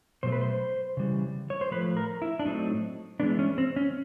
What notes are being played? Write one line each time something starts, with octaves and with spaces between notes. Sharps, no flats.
B2 F#3 A3 C5
B4
C5
C#3 E3 G3
C#5
C5
A2 F3 A3 B4
A#4
E4
D4
A2 F#3 A3 C4 D#4
E3 G#3 B3 D4
C#4
C4
C#4